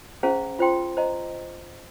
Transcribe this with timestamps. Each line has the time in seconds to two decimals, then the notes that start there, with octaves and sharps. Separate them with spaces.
0.23 C#4 G#4 C5 F5 A#5
0.59 F4 C5 G5 C6
0.97 C5 D#5 A#5